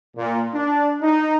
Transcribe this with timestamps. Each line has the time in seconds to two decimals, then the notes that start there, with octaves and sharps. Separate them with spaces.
0.16 A#2
0.54 D4
1.01 D#4